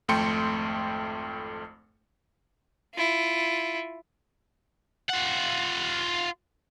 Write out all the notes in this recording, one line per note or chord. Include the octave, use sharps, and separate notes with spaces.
G#1 F2 A3 G5 C6 C#7
E4 F4
F4 F#5